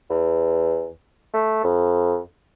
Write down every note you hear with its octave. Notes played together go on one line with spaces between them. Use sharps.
E2
A3
F2